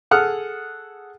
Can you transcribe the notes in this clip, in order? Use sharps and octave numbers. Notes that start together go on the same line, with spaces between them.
G#4 A4 F#5 D#6 F6